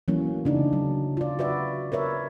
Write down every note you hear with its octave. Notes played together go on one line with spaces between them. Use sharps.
E3 F#3 A3 A#3 C#4
C#3 D4 D#4
F#3
F4 D5
F#4 B4 D5 E5
A#4 B4 C#5 E5